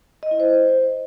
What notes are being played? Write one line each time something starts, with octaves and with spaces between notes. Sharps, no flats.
D#5
E4
C5